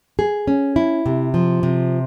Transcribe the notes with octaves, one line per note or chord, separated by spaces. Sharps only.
G#4
C#4
E4
C3
F3
C3